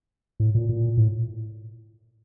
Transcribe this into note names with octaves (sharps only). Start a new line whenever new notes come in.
A2
A#2
A#2
A2